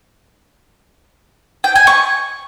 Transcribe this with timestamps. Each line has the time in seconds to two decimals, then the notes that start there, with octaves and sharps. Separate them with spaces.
1.64 G5
1.75 G#5
1.87 C#6